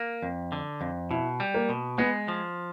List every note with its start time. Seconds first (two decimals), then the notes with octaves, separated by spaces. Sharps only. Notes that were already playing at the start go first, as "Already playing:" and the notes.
Already playing: A#3
0.22 F2
0.52 D3
0.81 F2
1.11 B2 E4
1.40 G3
1.55 A#3
1.69 B2
1.98 G#3 B3
2.28 F3